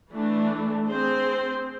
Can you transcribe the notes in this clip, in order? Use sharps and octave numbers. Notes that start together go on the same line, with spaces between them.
E3 A3 D4
C4 G#4 C5